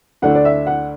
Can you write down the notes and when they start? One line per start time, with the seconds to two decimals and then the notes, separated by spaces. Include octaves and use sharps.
0.22 D2 D3 A3 D4 F#5
0.35 D5
0.45 E5
0.67 F#5